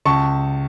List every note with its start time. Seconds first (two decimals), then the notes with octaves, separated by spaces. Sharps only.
0.05 C#2 A5 C#6